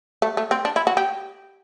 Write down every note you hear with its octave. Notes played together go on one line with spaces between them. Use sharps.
A3
A3
C4
D4
E4
F#4
G4